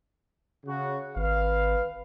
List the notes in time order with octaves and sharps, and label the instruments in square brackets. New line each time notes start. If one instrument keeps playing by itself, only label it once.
[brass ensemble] C#3 F#4
[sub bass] G#1 [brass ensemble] B4 F5